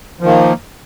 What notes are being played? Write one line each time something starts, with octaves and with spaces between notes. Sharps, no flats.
D#3 F3 A#3